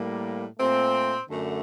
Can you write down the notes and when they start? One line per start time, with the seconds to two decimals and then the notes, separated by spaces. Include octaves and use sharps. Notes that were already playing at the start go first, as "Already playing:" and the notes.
Already playing: A2 G3 A#3
0.58 A#2 A3 C4
1.28 F#2 D3 A3